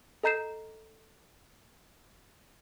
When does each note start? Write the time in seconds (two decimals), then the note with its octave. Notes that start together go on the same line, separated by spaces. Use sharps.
0.23 A4 D#5 A#5 G6 C7 E7